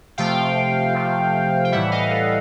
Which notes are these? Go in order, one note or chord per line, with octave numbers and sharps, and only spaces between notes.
C3 F3 A3 F5 G5
C3 F3 A3
G5
A2 E3 G3 E5 F#5
D#5 F5
A4 B4